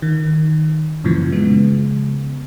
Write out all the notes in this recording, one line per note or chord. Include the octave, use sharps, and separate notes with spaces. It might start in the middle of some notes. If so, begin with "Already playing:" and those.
D#3
F#2 A#2 C#3 E3 F3
C#3 G#3 B3